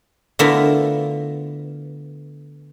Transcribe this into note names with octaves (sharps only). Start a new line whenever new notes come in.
D3 A3 B3 E4 F4 A#4